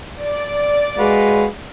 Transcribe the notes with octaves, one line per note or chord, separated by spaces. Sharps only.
D5
G#3 F#4 B4 F5